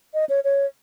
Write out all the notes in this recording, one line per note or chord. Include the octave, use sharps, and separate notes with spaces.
D#5
C#5
C#5